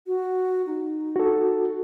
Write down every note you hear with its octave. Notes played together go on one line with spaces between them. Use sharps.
F#4
D#4
F#4 A4